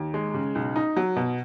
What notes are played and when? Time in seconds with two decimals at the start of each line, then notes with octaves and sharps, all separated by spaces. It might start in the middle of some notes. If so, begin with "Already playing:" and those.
Already playing: D#2
0.14 G#3
0.34 C#3
0.55 B1
0.76 D#4
0.96 F#3
1.16 B2